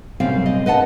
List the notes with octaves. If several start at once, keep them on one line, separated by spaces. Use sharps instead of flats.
F#2 C3 G3 C4 F5
D#5
B4 D#5 F#5 A5